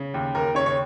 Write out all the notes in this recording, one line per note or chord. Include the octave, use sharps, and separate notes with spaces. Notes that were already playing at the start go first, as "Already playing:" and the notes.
Already playing: C#3
D#2
D#2 A#4
C#3 C#5
C#5